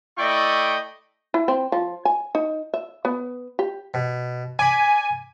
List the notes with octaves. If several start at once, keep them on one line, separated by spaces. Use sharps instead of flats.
A3 E4 D5 D#5 G5 C#6
E4
C4
F3
G#5
D#4
E5
B3
G4
B2
D5 G#5 B5